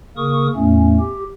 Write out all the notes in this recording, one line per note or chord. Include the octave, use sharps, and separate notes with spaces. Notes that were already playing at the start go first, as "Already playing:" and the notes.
C#3 A#3 A#4 C#6 D#6
E2 A2 A3 C#4
G4